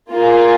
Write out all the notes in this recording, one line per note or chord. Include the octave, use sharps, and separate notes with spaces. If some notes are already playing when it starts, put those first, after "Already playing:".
A#3 F4 G#4